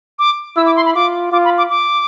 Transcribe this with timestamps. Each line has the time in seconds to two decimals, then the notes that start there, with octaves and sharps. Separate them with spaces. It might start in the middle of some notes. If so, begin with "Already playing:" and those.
0.19 D6
0.56 E4 E6
0.66 D6
0.76 C6
0.86 B5
0.95 F4 D6
1.32 F4 D6
1.44 B5
1.58 D6
1.70 D6